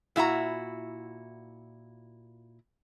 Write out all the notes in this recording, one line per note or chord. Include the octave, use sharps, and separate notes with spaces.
A#2 E4 F#4 A#5